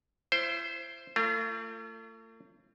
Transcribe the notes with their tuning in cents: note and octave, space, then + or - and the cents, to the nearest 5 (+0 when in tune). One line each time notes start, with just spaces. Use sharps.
E4 +35 C5 +0
A3 +40 F4 -30